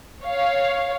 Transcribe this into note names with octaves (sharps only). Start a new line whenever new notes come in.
C#5 F5